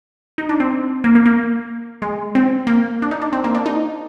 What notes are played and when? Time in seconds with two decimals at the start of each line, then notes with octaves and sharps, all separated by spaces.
0.38 D#4
0.49 D4
0.60 C4
1.04 A#3
1.15 A#3
1.26 A#3
2.02 G#3
2.35 C4
2.67 A#3
3.02 D4
3.11 D#4
3.22 D4
3.33 C4
3.44 A#3
3.55 D4
3.66 D#4